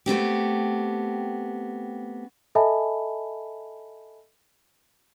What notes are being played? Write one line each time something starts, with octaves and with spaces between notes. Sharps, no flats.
A3 B3 C4 G4
A4 D#5 E5 G#5 A5 B5